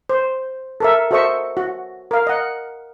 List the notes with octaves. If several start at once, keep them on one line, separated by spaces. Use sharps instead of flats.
C5
A4 A#4 E5
F#4 A4 C5 D#5 E5 C#6
F#4
A#4 F5
D#5 F#5